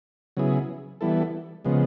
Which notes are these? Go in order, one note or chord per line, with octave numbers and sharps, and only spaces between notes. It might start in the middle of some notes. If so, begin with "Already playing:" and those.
C#3 F#3 B3 E4 G#4
E3 G3 B3 E4 A4
C#3 F3 G#3 B3